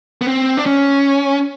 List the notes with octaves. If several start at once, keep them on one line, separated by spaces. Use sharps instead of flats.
B3
C4
D4
C#4